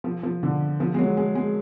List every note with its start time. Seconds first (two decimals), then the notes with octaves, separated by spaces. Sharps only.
0.04 F3
0.23 F3
0.43 D3
0.80 F3
0.94 G#3
0.99 F#3
1.17 G#3
1.35 G#3